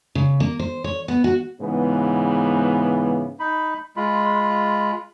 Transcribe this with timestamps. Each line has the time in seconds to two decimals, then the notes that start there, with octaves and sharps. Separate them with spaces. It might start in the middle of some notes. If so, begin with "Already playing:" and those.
0.15 C#3
0.40 A#3
0.59 C5
0.84 C#5
1.08 B3
1.24 F#4
1.61 G#2 C#3 E3 B3
3.40 D#4 B5
3.97 G#3 F4 B5